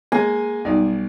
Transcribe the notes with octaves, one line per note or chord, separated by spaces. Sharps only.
G#3 A#3 G#5
B1 G3 D#4 D5